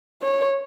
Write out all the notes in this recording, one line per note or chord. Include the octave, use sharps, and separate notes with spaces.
C#5